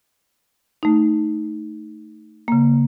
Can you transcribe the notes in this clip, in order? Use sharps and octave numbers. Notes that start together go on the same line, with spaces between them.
A3 D#4
C#3 A#3